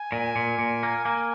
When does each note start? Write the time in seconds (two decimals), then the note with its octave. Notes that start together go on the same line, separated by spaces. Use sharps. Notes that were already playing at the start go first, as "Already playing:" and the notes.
Already playing: G#5
0.12 A#2
0.36 A#2
0.59 A#2
0.83 A#3
1.05 A#3